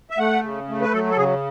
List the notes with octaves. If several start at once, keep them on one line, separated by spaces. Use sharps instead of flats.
E5
A3 F#5
C#3
A3
B4
F#3 A4
A4
C#3 G#4